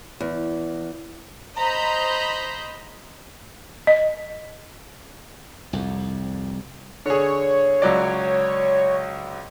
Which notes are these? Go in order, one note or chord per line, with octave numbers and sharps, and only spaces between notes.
E2
C5 D#5 A#5 B5 G6
D#5
C2 F2
D3 G#4 C#5
C#2 F#3 D5